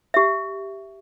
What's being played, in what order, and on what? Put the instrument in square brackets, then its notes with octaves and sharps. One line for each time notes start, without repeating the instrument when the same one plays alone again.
[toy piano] G4 E5